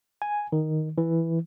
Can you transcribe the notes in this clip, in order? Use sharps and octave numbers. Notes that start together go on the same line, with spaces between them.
G#5
D#3
E3